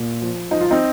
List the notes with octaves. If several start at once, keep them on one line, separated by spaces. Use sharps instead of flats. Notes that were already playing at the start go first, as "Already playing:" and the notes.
Already playing: A#2
F3
F3 D#4
F4
C4 D#4